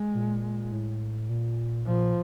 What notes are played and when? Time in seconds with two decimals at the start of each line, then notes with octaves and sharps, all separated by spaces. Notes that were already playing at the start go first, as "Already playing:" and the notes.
Already playing: G#3
0.14 A#2
0.72 A2
1.29 A#2
1.87 A#2 F3